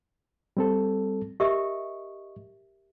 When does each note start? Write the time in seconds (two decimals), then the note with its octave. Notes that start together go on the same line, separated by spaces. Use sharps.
0.57 G3 C4 A4
1.40 G4 A#4 D#5 E5 C#6